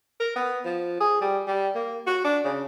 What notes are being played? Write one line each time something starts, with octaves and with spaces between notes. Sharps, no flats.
A#4
B3
F3
G#4
G3
G3
A#3
F#4
D4
C#3